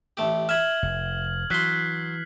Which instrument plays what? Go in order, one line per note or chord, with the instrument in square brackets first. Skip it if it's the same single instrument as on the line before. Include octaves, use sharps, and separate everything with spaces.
[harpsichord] A1 A3 G4
[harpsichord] E5 B5 [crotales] F6 G#6 F#7
[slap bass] F1
[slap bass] E3 [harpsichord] F#3 C6 [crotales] F#6 B6 C7